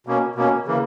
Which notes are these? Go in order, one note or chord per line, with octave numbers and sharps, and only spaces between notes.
B2 A#3 C#4
B2 A#3 C#4
C#3 E3 A#3